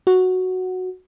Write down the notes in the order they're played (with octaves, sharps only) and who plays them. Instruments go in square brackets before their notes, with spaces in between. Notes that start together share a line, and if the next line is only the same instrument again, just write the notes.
[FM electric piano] F#4